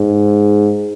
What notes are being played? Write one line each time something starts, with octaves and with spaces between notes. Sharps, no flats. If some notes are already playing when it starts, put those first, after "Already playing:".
Already playing: G#2